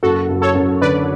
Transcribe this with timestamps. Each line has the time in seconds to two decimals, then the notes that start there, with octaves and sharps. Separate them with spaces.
0.03 F#1 F#4 A4
0.29 F#1
0.42 A4 C#5
0.55 F#2
0.81 D3 B4 D5